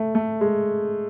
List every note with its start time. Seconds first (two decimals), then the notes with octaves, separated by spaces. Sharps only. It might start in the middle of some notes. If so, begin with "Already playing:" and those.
Already playing: A3
0.15 A3
0.41 G#3